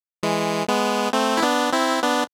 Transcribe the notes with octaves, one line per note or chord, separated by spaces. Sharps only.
E3 G#3
G#3 B3
A3 C4
E4
B3 D4
C4 E4
B3 D4